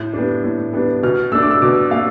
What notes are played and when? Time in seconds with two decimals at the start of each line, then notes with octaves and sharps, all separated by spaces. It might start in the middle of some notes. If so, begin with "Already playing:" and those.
Already playing: A2 G6
0.13 G3 B3 D4
0.44 A2
0.73 G3 B3 D4
1.03 B2 F6
1.32 A3 D4 E6
1.42 D6
1.51 E6
1.62 B2 D6
1.91 A3 F5